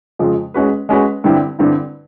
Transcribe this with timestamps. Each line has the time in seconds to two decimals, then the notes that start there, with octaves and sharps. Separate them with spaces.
0.19 F2 C#3 F3 G#3
0.54 G#3 C#4 F#4 B4
0.89 G#3 C#4 F#4 B4
1.24 G2 D3 G3 C4 E4
1.59 G2 D3 G3 C4 E4